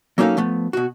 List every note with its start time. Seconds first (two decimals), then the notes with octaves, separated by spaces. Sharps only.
0.18 F#3 A#3 C#4 D#4 A4 F5
0.37 F3 A3 B3
0.73 B2 F#4